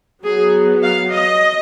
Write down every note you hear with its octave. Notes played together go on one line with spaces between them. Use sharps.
F#3 B3 G#4
F5
D#5